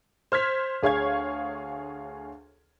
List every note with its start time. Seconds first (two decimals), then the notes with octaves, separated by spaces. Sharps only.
0.32 C5 F6 G#6 B6
0.83 D2 G#4 C#5 F5 C#6 G#6